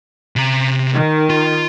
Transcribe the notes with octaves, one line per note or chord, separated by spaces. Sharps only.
C3 A#5
D#3
F4